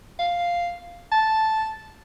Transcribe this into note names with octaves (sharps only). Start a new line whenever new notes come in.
F5
A5